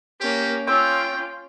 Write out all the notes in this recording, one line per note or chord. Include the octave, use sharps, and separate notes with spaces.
A#3 C#4 G4
C#4 F4 G5 D6 E6